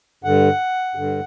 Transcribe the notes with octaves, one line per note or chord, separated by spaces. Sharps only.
G2 D3 F#5
G2 D3